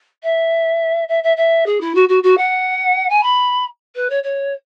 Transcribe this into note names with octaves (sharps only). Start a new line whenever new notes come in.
E5
E5
E5
E5
G#4
E4
F#4
F#4
F#4
F#5
G#5
B5
B4
C#5
C#5